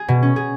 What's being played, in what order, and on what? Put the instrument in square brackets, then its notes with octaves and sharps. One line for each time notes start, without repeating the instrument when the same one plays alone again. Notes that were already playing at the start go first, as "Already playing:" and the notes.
Already playing: [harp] G#4
B2
C#4
G#4